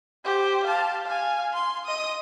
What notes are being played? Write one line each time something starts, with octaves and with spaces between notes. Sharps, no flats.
G4 C5
F5 A5
F5 G#5
C6
D#5 D#6